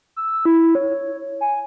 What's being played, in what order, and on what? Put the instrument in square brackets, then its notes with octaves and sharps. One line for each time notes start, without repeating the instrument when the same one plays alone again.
[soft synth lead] E6
E4
C#5
G#5